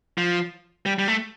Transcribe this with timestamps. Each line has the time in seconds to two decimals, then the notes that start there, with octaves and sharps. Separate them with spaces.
0.18 F3
0.86 G3
0.99 G3
1.08 A3